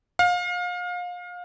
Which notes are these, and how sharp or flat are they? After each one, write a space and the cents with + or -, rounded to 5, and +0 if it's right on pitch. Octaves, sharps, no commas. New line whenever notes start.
F5 +30